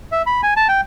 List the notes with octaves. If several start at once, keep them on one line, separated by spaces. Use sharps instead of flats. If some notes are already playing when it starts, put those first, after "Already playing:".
E5
B5
G#5
A5
G5